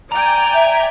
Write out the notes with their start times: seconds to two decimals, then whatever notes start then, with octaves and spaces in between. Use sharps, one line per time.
0.12 D5 G5 G#5 A#5
0.53 E5